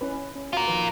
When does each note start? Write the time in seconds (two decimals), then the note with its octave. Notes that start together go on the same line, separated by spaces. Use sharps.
0.01 C#4 E4 B4
0.36 C#4
0.53 F4 F#4 A#4
0.67 D#3 F3 B4